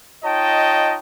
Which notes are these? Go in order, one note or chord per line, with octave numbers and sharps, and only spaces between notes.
D#4 F4 C#5 D#5 G5 A5